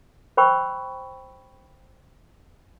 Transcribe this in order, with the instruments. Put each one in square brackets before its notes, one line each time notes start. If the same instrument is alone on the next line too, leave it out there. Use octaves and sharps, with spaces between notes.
[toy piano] C5 G5 B5 C#6 E6